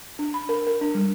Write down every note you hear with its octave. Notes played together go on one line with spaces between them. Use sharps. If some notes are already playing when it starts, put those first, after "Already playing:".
D4
B5
A#4
A#4
D4
G3